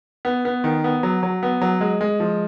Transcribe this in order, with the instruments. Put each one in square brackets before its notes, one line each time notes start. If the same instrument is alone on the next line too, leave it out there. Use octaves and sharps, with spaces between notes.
[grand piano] B3
B3
D#3
B3
F#3
F#3
B3
F#3
G#3
G#3
F3